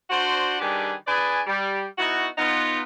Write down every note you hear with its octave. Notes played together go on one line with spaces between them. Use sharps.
D4 F#4 C5
D#3 G3 D4 G4 G#4 B4
D4 G#4 B4 D5 G#5
G3
B3 D#4 E4 F#4
B3 D#4 F4